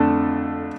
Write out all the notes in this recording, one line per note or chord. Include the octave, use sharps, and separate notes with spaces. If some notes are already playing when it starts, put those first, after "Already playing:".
Already playing: F2 D3 A3 D4 A4